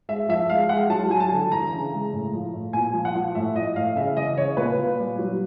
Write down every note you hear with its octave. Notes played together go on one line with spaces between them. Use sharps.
G#3 E5
F3 E5
G#3 F5
G#3 F#5
F#3 A5
F#3 G#5
A5
D3
E3 A#5
C#3
G#3
A2
F3
A2
A#2 G#5
F3
F#5
F3
A2 E5
F3 D#5
A2 F5
C#3 E5
E3 D#5
C#3 C#5
A#2 B4
A#2
G3
F#3